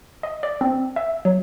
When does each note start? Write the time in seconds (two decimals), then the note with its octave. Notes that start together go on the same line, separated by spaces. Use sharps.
0.23 D#5
0.43 D5
0.61 C4
0.96 E5
1.25 F#3